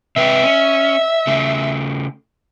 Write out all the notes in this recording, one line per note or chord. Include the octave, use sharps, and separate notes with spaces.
C3 B4 E5 G5
C#4
C#3 A3